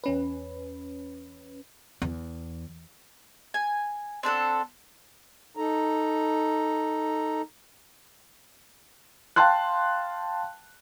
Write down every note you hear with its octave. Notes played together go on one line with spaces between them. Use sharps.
E2 C#4 B4
E2
G#5
C4 D4 A4 F#5
D#4 A4 A#5
F5 G5 A5 C6 F#6